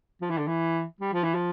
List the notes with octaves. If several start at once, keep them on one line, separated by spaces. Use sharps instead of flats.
F3
E3
D3
E3
G3
F3
E3
F3